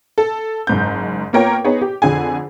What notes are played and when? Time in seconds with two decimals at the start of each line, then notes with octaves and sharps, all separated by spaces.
0.18 A4
0.67 F#1 G#2 G6
1.33 A#3 B3 F4 A#4 C#5 G5
1.64 B3 D#4 G#4 C#5
1.81 G4
2.02 F2 D3 G#4 G#5